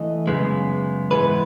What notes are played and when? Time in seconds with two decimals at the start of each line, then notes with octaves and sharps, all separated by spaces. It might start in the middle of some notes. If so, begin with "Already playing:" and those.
Already playing: E3 A3 D#5
0.27 F#2 C#3 G#3 B3
1.11 G#2 E3 G#3 B3 B4